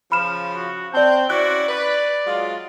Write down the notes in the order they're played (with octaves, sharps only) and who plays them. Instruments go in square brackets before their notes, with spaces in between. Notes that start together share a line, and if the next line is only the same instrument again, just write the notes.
[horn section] C#3 F3 [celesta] B5 F6 E7
[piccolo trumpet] F#4
[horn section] C4 [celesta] D5 A5 [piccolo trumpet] G6
[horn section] C#4 E4 D5 [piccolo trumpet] F#4 [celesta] F#6
[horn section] B4 [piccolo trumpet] D5
[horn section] F#3 G#3 F4